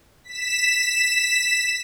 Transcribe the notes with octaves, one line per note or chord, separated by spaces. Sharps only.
B6 E7